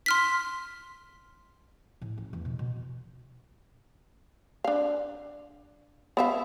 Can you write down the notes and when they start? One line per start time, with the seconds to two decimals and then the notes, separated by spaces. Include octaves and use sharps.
0.06 C6 F6 B6
2.01 A2
2.18 C#4
2.33 E2
2.45 B2
2.59 B2
4.64 D4 F5
6.17 B3 E5 F5